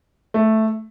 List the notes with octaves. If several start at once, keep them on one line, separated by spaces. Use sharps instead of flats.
A3